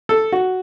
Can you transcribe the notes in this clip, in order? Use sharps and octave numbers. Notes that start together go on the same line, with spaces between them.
A4
F#4